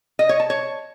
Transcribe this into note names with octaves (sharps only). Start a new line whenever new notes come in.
D#5
C#5
A5
C#5